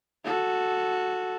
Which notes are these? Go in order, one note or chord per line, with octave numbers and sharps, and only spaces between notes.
F#4 A4